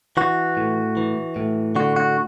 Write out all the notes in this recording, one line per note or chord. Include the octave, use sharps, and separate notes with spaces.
E3 F#4
A2
E3
A2
D3 F#4
F#4